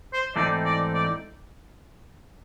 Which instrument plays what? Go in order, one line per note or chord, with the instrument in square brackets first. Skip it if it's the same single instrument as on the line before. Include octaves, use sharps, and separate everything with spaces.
[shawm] C5
[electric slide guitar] G#2 E3 A3 C4 D#4 [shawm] D5
[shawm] D5
D5